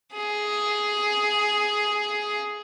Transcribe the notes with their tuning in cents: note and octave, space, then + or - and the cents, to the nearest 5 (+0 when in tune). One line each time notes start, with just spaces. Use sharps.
G#4 +5